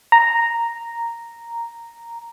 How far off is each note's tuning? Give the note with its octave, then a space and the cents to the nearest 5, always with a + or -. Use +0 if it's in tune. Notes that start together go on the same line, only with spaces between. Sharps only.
A#5 -5